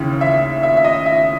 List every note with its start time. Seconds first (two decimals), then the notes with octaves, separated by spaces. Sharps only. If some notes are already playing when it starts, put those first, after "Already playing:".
Already playing: D#2 C#3 E3
0.21 E5
0.63 E5
0.77 E5
0.84 D#5
1.06 E5